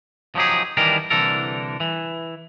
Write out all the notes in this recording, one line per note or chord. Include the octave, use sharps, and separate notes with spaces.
F3 F#3 D#4 G4 G#4
D#3 E3 G3 D4 A#4
C2 D3 E3 A4 A#4
E3